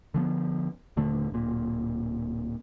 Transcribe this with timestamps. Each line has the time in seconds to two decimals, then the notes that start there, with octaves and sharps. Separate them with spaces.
0.14 D3 F3 A#3 B3
0.97 D#1 D3 A3
1.30 D1 A#2